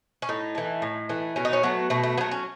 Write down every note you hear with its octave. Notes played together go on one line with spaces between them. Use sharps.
C#4
A2 D#4
E3 A3
A2
E3 A3
B2 C#4
D#4
C#4
F#3 A3 B3
B2 A3
A3
F#3 A3 B3
C#4